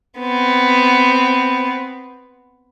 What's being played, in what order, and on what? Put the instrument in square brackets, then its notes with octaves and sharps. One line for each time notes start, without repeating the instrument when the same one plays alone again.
[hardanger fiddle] B3 C4